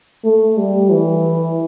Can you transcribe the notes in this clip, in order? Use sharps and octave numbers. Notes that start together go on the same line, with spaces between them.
A3
G3
E3